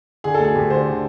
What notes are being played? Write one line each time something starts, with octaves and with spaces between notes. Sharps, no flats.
D3 G#4
A4
D2 G#4
D2 G4
D3 C5
D3